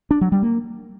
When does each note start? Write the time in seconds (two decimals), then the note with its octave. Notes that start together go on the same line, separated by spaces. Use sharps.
0.11 D4
0.21 F#3
0.32 G3
0.43 A#3